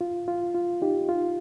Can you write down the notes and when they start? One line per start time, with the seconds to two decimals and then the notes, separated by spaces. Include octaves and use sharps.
0.01 F4
0.28 F4
0.54 F4
0.82 D#4 G4
1.09 F4